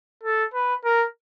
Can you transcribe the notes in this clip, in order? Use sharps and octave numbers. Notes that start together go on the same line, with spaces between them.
A4
B4
A#4